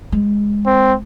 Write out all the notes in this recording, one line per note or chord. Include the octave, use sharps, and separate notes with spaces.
G#3
C4